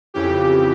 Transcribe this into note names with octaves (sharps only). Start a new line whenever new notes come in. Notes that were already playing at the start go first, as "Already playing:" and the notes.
F2 C#3 E3 G4